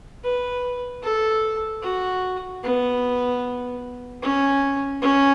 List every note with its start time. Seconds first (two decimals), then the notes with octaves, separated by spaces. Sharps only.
0.24 B4
1.03 A4
1.83 F#4
2.63 B3
4.23 C#4
5.02 C#4